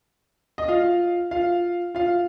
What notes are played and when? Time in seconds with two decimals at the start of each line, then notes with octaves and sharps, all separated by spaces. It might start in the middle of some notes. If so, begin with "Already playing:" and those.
0.58 D#5
0.68 F4 F5
1.31 F4 F5
1.95 F4 F5